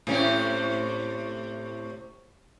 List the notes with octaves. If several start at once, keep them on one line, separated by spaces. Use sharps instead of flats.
A2 C3 C#4